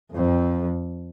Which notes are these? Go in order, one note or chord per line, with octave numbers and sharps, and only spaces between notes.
F2